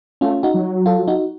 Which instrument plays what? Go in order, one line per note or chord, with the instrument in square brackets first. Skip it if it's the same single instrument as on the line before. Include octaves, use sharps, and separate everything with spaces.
[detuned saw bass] A3 [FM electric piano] C#4 F4
[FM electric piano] D#4 F#4
[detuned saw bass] F#3
[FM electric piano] F4 A4
D#4 F#4